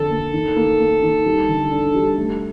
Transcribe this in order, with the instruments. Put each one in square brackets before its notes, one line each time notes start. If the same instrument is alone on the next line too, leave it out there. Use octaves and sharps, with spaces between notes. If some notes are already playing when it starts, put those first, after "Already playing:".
Already playing: [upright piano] F2 D3 [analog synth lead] A4
[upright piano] A#3
D#3
A#3
A#3
D#3
G3
D3
D4
G3
A3